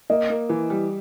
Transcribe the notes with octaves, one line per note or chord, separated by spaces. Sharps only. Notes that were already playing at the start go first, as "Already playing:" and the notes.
A#3 D#5
A#3
E3
G3